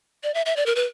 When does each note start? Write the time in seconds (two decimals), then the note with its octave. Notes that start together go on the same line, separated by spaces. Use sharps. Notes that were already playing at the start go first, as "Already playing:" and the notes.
0.24 D5
0.34 E5
0.46 E5
0.56 D5
0.66 A#4
0.75 B4